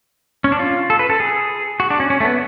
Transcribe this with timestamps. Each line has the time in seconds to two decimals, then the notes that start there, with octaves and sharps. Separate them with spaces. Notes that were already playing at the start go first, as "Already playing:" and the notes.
0.44 C#4
0.52 D4
0.59 F4
0.90 A4
0.99 B4
1.10 A4
1.20 G#4
1.80 F#4
1.90 D4
2.00 C#4
2.10 C#4
2.20 A3
2.25 B3